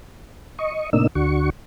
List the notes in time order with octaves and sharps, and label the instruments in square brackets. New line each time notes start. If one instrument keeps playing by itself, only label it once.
[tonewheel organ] D#5 C#6
A2 C3 A#3 D4 D#4 E6
D2 D3 F#4 C#6